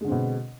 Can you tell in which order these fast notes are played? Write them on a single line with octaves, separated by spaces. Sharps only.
G#3 D3 C4 B2